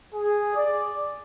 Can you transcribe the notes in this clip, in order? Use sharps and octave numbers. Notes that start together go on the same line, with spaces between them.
G#4
D5